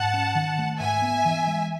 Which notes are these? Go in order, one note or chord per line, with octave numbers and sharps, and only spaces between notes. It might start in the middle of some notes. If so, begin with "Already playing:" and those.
Already playing: G#2 F#5 A5
C#4
D#3
A3
G#2 E5 G#5
B3
E3
G#3